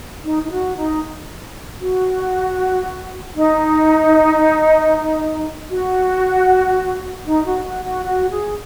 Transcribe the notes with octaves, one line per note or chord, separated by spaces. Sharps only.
D#4
D#4
F#4
D#4
F#4
D#4
F#4
D#4
F#4
F#4
F#4
F#4
G#4